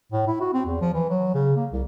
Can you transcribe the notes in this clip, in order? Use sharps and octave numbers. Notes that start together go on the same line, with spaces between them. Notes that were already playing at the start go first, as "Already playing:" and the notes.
A2
E4
F#4
C4
E2
F3
E3
F#3
C#3
A#3
C2